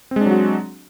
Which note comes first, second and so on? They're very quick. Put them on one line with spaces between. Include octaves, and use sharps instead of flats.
C4 G#3 D4 F#3 F#4